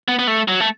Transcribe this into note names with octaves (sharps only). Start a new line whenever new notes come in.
B3
B3
A3
F#3
A3